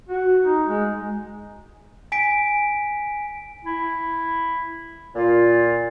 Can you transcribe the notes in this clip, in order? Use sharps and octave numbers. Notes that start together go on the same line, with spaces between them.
F#4
D#4
G#3
G#5 B6 D7
E4
A#2 F4